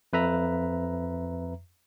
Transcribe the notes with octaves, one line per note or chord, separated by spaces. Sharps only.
F2 B4 E5 A#5